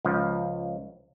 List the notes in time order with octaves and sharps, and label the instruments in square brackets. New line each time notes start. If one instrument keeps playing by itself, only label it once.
[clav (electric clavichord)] C#2 F3